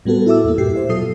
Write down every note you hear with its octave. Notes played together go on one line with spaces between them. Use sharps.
A2 G3 B3 F#4 A4
E4 F#4 A4 E5 D6 E6
E2 A#3
G2 A#2 G4 C7
C5 E5
B2 F#3 F4 A4 D#6 C7